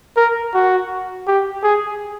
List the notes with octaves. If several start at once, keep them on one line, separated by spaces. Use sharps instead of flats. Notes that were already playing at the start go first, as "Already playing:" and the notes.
A#4
F#4
G4
G#4